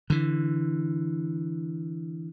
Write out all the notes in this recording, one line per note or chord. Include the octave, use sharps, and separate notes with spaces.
D3 E3